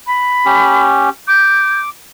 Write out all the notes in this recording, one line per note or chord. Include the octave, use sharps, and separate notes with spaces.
B5
C#4 G4
D6 G6